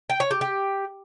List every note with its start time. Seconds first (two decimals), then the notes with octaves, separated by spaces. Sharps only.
0.10 G5
0.20 C#5
0.31 G4
0.41 G4